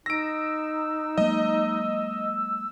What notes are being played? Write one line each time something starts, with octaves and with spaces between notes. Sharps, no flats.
D#4 E6 A#6 D7
F#3 G#3 A#3 D#5